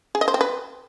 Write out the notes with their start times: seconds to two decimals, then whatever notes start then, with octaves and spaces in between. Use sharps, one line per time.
0.15 G#4
0.21 D#5
0.28 C5
0.34 C4
0.41 B4